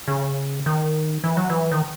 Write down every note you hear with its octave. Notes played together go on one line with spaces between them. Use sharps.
C#3
D#3
E3
F#3
E3
D#3